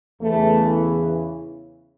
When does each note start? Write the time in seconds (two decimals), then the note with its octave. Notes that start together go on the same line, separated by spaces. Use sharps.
0.21 E2 C#3 E3 A3